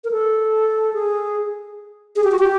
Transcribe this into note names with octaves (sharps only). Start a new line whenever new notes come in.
A#4
A4
G#4
G#4
G4
F#4
G4